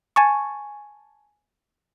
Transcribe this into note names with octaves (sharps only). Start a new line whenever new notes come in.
G#5 A5 C#6